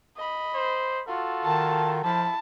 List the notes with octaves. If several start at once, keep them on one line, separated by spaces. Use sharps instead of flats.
D#5 B5
C5
F4 F#4 A4
D#3 A5
F3 E4 A5